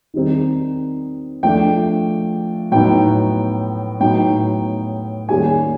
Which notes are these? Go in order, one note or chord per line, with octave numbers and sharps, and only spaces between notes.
D#3 G3 C4 D#4
F3 A3 D4 G5
A2 F#3 B3 D#4 G5
A2 F#3 B3 D#4 G5
D#3 G3 A#3 C#4 G#5